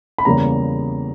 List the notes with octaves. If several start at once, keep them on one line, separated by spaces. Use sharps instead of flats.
B5
E2 C#3 G3 A#3 A#5